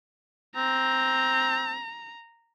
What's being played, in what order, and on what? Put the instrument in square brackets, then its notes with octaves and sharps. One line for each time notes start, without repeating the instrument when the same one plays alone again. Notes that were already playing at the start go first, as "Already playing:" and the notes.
[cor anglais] C4 [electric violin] A#5